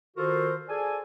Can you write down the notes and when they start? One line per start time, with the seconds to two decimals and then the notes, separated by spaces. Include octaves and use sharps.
0.17 D#3 F4 F#4 A4 A#4 C5
0.69 G#4 A4 D5 G#5